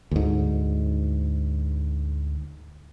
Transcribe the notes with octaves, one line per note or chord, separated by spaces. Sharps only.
D2 G#2